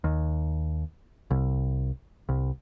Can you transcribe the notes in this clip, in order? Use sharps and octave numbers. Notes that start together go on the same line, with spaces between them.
D#2
C2
C2